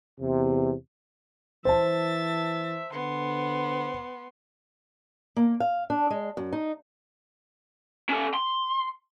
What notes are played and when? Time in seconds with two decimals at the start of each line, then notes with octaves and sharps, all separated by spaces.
0.21 E2 C3
1.65 E3 C5 E5 A5 A6
2.92 D3 B3 C6
5.37 A#3
5.60 F5
5.90 D4
6.10 G#3
6.37 F#2
6.53 D#4
8.09 C#4 A4
8.34 C6